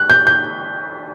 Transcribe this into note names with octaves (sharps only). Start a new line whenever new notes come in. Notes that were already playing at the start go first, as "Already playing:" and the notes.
Already playing: F#6
G6
G6